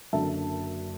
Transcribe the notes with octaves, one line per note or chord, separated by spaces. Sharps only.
F#1 F#2 D3 E5 A5